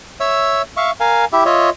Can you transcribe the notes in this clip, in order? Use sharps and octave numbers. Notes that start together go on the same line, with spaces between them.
C#5 E5 E6
E5 F5 C#6
A#4 F5 G#5
E4 G4 E5
F4 C#5 D#5 E5